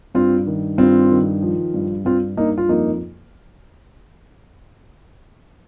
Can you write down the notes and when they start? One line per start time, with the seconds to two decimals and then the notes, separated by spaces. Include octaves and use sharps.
0.15 G2 C4 F4
0.47 D#3
0.78 G2 C4 F4
1.11 D#3
1.42 F3
1.74 G2
2.05 G2 C4 F4
2.37 G2 A#3 D#4
2.58 F4
2.69 F2 A#3 D#4